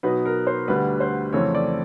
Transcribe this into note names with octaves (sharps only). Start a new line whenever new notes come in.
B2 F#3 B3 D#4 B4
A#4
C5
D2 D3 G3 B4
C5
F2 C#3 E3 A3 C4 C#5
D5